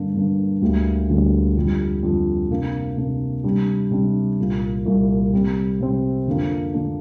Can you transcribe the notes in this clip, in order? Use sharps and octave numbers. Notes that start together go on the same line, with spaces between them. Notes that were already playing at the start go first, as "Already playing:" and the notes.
Already playing: G2 D3 A#3 D4
G2 D3 A#3 D4
D2 D3 G3 A#3
D2 D3 G3 A#3
F2 D3 G3
F2 D3 G3
C3 A#3 D4
C3 A#3 D4
C3 G3 D4
C3 G3 D4
C2 A#2 A#3
C2 A#2 A#3
C3 G3 C4
C3 G3 C4
F2 D3 A#3 D4
D3 A#3 D4